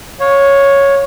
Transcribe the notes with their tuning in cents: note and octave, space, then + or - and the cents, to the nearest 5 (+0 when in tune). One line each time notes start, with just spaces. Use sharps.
C#5 +0 F5 +30